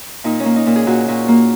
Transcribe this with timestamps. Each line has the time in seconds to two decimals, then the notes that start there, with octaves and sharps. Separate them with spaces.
0.24 A#2 D#4
0.40 C#4
0.46 A#3
0.56 D#4
0.66 A#2
0.76 G#4
0.87 A#2 F#4
1.08 A#2
1.28 A#3